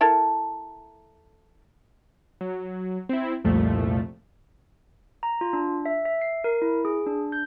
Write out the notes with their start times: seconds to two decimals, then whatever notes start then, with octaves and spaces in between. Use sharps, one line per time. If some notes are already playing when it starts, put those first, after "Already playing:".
0.01 E4 A4 A#4
2.41 F#3
3.09 C4 E4
3.44 C2 F2 A#2 F3 A3
5.23 A#5
5.41 F4
5.53 D4
5.86 E5
6.05 E5
6.21 C7
6.44 A#4
6.62 E4
6.85 G#4
7.06 D4
7.32 G6